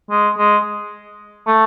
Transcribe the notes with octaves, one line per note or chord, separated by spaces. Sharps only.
G#3
G#3
A3